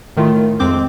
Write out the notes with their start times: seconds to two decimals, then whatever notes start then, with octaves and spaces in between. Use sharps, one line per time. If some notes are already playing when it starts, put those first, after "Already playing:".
0.16 A2 D#3 A3 F4
0.60 F2 G#3 C4 D6 G6